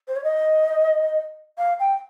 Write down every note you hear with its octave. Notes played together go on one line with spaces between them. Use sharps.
C5
C#5
D#5
F5
G5